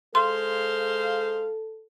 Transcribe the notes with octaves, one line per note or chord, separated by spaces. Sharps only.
G#3 A4 C5 F5 C6